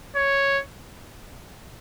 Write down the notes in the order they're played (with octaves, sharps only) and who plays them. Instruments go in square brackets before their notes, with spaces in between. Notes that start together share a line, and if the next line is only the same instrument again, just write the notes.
[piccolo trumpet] C#5